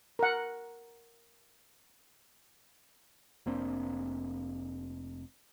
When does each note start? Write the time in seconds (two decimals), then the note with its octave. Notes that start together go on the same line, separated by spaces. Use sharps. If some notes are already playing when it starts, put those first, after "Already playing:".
0.19 A#4 F#5
3.46 F1 A#3 C4 D4